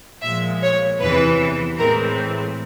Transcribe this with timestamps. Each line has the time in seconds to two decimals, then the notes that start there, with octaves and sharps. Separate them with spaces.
0.22 A#2 F3 G#3 E5
0.62 C#5
1.00 E2 C3 E3 B4
1.78 A2 E3 G#3 C4 A#4